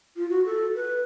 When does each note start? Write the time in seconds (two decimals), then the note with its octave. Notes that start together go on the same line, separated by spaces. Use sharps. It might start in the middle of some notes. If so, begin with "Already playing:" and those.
0.16 F4
0.30 F#4
0.46 A4
0.75 B4